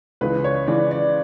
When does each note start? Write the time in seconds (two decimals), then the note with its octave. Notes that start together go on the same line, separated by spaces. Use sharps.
0.21 C#2 C#3 E3 B4
0.44 C#5
0.67 C#2 C#3 E3 D5
0.91 D5